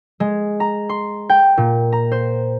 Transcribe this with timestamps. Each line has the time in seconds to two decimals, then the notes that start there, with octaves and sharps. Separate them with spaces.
0.20 G#3
0.60 A#5
0.89 C6
1.29 G5
1.58 A#2
1.92 A#5
2.12 C5